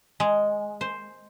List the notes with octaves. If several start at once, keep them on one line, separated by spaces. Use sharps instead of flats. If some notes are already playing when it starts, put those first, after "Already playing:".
G#3
C5